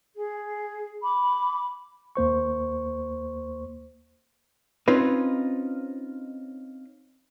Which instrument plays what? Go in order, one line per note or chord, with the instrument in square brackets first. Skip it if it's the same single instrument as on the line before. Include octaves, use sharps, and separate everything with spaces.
[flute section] G#4
B5 D6
[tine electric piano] D#2 A#3 C5 C#6
[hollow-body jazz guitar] C4 C#4 D#4 F4 B4